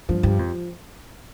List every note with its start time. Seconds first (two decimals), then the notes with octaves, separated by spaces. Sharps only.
0.09 G2 F3
0.23 G2 G4
0.38 F2 F3